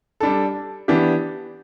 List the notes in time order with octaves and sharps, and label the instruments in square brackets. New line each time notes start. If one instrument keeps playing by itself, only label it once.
[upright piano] G3 D4 A4
E3 B3 D4 G4